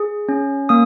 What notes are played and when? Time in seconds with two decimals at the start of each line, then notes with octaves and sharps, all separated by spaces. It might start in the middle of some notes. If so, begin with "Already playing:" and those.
Already playing: G#4
0.29 C#4
0.69 A#3 D#6